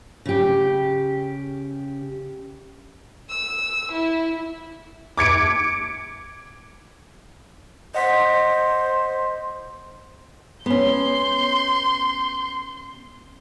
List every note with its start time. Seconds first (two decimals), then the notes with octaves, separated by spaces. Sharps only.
0.26 C#3 G4
3.29 E6
3.92 E4
5.17 D6 G#6 C#7 D7
7.95 C5 D#5 F#5 B6
10.66 B3 C#4 C6 G6